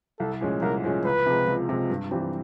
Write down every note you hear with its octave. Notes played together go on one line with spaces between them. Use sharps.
C2 A4
A#2 F3 G#3 C#4
C2 A#4
A#2 F3 G#3 C#4
C#2 B4
C3 F3 G#3
C#2
C3 F3 G#3
G2
E3 G3 C4